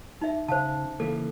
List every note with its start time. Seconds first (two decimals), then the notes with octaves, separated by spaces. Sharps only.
0.21 D#4 E5
0.48 C#3 C5 F5 A5
1.00 C#3 E3 A#3 A4